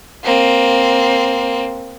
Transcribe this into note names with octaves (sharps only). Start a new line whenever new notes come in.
A#3 C4